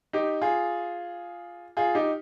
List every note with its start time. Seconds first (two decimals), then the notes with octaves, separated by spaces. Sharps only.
0.13 D#4 G4
0.42 F4 G#4
1.77 F4 G#4
1.95 D#4 G4